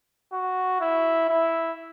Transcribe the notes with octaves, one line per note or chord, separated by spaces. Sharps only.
F#4
E4
E4